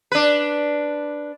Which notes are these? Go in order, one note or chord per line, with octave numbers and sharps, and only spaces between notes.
D4 B4